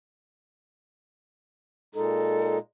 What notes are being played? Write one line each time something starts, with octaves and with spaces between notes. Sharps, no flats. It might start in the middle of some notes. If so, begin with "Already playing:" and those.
A#2 G#3 D#4 A4